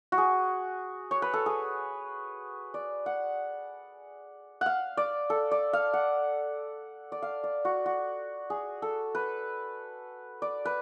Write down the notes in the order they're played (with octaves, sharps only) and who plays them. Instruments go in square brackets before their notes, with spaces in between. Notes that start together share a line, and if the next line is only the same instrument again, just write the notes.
[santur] F#4
G#4
C#5
B4
A4
G#4
D5
F#5
F5 F#5
D5
A4
D5
F5
F#5
D5
F5
D5
F#4
F#4
G#4
A4
B4
D5
B4